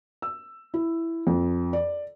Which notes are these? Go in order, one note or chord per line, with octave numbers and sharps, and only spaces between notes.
E6
E4
F2
D5